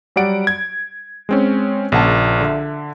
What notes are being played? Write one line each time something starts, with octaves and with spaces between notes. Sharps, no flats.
F#3 G3 D5 F#5 D7
G#6
G#3 C4 C#4
A#1 C#3 A#3 F#5 A5
D3 E5